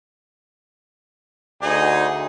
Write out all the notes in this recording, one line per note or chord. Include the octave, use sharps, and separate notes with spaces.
D2 D#4 G#4